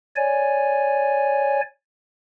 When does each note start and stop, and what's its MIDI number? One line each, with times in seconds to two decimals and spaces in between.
0.16 1.61 73
0.16 1.61 74
0.16 1.61 80